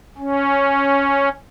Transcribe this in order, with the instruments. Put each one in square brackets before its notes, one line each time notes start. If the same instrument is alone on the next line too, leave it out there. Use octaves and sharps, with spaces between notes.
[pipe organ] C#4